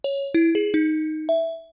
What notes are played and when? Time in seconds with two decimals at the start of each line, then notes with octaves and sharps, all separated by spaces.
0.04 C#5
0.34 E4
0.55 G#4
0.74 D#4
1.29 E5